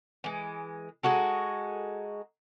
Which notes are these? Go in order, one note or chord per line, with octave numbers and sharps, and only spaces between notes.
E3 G#3
G#3 D#4 F#4 A4